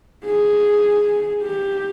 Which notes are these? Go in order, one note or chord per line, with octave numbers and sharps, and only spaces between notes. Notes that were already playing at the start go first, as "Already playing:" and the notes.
G#4
G4